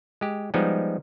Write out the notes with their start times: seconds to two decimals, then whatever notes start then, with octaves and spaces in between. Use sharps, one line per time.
0.21 G#3 G4
0.54 F3 G3 G#3 B3 D#4